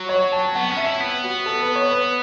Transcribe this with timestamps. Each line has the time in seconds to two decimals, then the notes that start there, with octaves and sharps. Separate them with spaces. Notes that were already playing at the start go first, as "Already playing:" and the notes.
Already playing: F#3
0.09 C#5
0.32 A5
0.55 B3 F#5
0.70 C#4
0.77 E5
0.85 E4
1.00 B3
1.23 F#4
1.46 A4
1.61 B4
1.76 C#5
1.90 B4